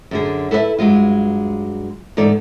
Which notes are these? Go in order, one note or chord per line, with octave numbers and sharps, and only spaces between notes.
F#2 D3 G#4
E4 A4 B4 D#5 E5
G2 F#3 G#3 F4
E2 G#2 D#4 A4 D5